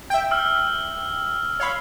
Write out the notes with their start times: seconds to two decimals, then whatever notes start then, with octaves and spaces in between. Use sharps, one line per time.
0.10 E5 G5
0.31 E6 F6
1.60 C#5 F5 B5